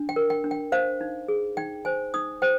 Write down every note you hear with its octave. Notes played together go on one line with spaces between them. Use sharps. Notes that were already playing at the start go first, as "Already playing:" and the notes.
Already playing: D4
G5
A#4
G5
D4
G5
C5 F5
D#4
G#4
D#4 G5
C5 G#5
D#4 D#6
C5 G5